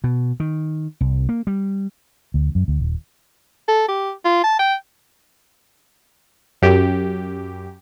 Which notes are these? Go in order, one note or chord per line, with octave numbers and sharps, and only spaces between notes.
B2
D#3
C2
A#3
G3
D2
F#2
D2
D#1
A4
G4
F4
A5
G5
F#2 G4